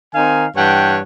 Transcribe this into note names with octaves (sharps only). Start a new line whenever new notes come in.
D#3 C4 D#4 F5 G#5
G2 E3 C#5 F#5 G5